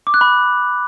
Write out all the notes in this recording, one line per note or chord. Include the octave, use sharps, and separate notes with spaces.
D6
F#6
B5